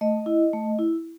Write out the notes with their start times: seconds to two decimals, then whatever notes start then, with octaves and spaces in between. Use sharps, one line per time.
0.01 A3 D#5
0.26 E4
0.53 A3
0.79 E4